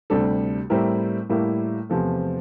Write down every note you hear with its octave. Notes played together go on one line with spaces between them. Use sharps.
D2 C3 G3 D4 A4
A2 G3 C4 E4 A#4
A2 G3 A#3 E4
E2 C3 F3 A3